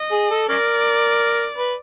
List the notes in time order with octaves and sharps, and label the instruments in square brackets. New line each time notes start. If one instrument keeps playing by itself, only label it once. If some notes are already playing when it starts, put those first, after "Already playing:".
Already playing: [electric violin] D#5
[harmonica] G#4
A4
[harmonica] C#4 A#4 [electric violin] D5
[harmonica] B4